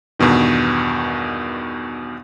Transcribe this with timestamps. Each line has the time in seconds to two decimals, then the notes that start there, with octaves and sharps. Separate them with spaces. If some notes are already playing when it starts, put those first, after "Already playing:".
0.19 E2 G2 B2 D#3